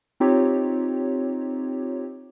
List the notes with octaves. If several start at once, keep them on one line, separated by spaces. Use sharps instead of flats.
C4 D#4 F4 G4 C#5